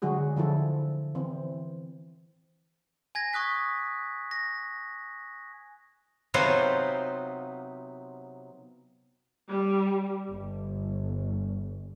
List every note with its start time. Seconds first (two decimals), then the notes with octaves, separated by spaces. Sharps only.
0.02 D3 F#3 G#3 F#4 G#4
0.36 D3 F3 E4 A4
1.15 E3 C4
3.15 G#5 G#6 A#6
3.33 C#6 D#6 F#6 B6
4.31 A#6
6.34 C3 F#3 B3 D#4 F4 C5
9.48 G3
10.29 G1